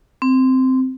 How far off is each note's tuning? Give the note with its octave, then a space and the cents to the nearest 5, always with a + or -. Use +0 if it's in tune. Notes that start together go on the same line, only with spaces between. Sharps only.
C4 -10